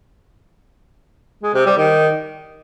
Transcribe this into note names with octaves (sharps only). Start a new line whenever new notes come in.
G#3
C3
G3
D#3